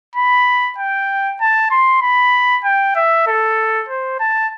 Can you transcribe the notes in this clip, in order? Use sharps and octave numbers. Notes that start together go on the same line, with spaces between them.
B5
G5
A5
C6
B5
G5
E5
A4
C5
A5